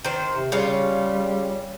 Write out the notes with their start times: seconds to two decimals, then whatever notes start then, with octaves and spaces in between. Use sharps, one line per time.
0.04 D#3 C5
0.33 C3
0.52 C#3 G3 F4 C#5